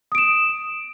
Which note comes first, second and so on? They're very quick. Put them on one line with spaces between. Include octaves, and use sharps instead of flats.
D#6 D7 E7